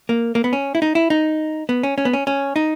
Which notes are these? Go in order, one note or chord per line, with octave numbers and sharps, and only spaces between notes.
A#3
A#3
B3
C#4
E4
D#4
E4
D#4
B3
C#4
C#4
B3
C#4
C#4
D#4